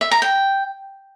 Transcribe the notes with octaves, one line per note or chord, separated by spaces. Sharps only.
E5
A#5
G5